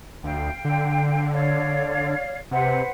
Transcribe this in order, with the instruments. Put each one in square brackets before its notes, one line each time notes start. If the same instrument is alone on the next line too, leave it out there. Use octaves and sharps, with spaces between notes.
[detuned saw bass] D2 [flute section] F5 G5
[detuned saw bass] D3
[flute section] C#5 D5 F5
[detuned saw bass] C3 [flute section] B4 C5 F#5